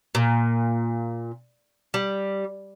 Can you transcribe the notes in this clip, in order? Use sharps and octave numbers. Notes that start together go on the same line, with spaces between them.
A#2
G3